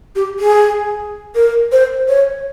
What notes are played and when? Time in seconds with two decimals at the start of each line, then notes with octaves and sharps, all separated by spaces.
0.16 G4
0.39 G#4
1.35 A#4
1.72 C5
2.08 C#5